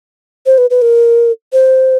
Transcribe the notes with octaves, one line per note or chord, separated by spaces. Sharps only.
C5
B4
B4
A#4
C5